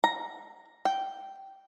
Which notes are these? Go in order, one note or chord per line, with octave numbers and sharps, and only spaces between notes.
A#5
G5